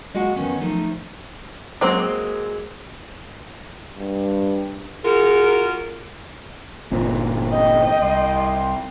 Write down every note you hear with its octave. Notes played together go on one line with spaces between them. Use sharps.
G#3 A#3 F#4 F5 F#5
D#3 B3 C#4
F3 A3 D#4
F#3 G#3 A#3 C4
G2
F4 F#4 G#4 A#4
G1 A#2 C4
D#5 G5
C2 C6